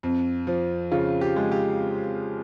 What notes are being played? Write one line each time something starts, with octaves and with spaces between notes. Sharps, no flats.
F2
F3
C#3 F4
G4
G#3
G4